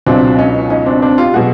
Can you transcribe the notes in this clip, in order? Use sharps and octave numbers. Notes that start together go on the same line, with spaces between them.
C#2 B2 F#3 C4 D4
C#4 D#4
C#4 D#4
C4 D4
C4 D4
F4 G4
B2 F#3 F#4 G#4